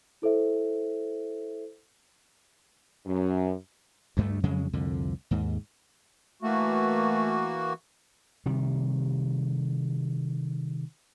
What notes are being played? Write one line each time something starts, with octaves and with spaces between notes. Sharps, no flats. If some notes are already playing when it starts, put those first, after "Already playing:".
E4 A4 C5 E5
F#2
D2 G2 G#3 A3
F2 C#3 F#3 G#3
C2 F2 D3
D#2 G#2
E3 A3 A#3 F#4
C3 D#3 G3